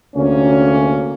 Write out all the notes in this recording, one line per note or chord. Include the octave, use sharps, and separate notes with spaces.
D2 C3 A#3 C#4